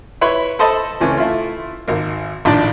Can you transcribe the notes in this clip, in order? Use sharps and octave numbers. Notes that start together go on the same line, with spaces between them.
E4 B4 C#5 B5 C6
A4 C5 D#5 E5 A5 B5
C#2 E3 A3 C4 C#4
A3 E4 F4
G#1 A#3
A#1 A2 D#3 D4 D5